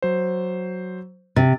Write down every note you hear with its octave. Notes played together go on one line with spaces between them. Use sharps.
F#3 C5
C3 A6